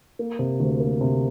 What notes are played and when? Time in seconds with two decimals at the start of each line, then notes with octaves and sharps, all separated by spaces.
0.19 A#3
0.39 C3
0.60 D2
0.80 A#3
1.01 C3